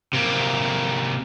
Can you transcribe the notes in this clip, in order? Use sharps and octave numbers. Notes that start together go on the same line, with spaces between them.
C3 A#3